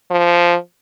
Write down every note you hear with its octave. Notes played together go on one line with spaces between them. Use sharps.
F3